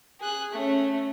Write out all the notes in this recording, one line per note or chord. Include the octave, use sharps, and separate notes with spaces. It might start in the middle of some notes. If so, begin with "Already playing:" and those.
G#4 F#6
A3 C#4